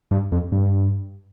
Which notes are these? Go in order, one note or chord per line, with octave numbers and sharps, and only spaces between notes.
G2
F2
G2